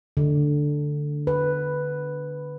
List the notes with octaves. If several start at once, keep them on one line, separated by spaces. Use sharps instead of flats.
D3
B4